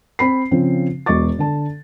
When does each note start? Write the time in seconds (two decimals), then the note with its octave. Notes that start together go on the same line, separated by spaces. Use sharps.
0.19 C4 B5 C7
0.51 C#3 F3 C4
1.06 E1 B2 D#5 C#6 D6 A6
1.39 D3 A5